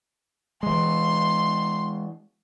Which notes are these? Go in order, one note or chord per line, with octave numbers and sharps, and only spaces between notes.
E3 G#3 C6